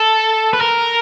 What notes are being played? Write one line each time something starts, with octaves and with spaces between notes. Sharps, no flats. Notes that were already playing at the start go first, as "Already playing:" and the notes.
Already playing: A4
B4
A#4